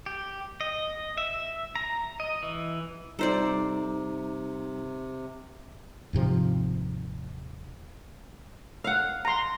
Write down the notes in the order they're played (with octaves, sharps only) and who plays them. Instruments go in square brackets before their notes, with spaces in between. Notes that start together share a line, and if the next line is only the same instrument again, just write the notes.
[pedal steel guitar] G4
D#5
E5
A#5
D#5
E3
[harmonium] C3 [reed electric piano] G3 D#4 A#5 [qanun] A4 C5 D5
[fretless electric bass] D#1 G#2 C3 F3
[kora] F5 F#5
[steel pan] A#5 C6